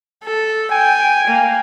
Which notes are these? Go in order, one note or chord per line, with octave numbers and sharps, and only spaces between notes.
A4
G5 G#5
A#3